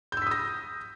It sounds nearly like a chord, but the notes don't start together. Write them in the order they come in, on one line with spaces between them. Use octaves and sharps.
G6 E6 B6 D#6 A#6